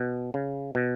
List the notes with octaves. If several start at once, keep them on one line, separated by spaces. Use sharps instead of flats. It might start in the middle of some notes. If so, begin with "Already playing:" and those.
Already playing: B2
C#3
B2